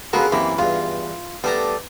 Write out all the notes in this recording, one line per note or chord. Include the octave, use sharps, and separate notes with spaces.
C#3 B3 F4 F#4 A4 A#4
F#2 C3 E3 A#3
E2 G2 F4
G3 A3 B3 D4 A#5